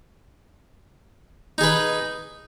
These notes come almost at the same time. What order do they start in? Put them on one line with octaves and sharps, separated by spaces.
D#4 G#4 B4